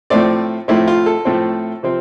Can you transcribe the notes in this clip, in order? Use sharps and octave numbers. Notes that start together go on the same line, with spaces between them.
A2 F3 A3 C4 D5
A2 F3 A3 C4 E4
F4
A4
A2 F3 A3 C4
C3 F3 C4